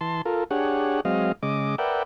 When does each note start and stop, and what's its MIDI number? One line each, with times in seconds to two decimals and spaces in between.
0.01 0.22 52
0.01 0.22 81
0.01 0.22 84
0.25 0.44 65
0.25 0.44 69
0.25 0.44 70
0.51 1.00 62
0.51 1.00 67
0.51 1.00 68
0.51 1.00 73
0.51 1.00 78
1.05 1.32 54
1.05 1.32 56
1.05 1.32 60
1.05 1.32 75
1.05 1.32 77
1.43 1.76 49
1.43 1.76 56
1.43 1.76 75
1.43 1.76 86
1.78 2.03 70
1.78 2.03 71
1.78 2.03 74
1.78 2.03 76
1.78 2.03 78
1.78 2.03 79